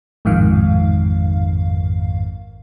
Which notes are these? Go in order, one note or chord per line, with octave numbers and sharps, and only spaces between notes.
A1 F2 G#2 D#3 F5